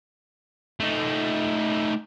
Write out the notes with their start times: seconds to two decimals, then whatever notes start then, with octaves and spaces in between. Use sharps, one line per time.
0.80 A3 D#4